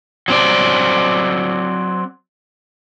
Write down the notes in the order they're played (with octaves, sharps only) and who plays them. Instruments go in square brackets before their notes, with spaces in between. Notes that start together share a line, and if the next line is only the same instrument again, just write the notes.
[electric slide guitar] F#3 C4 D5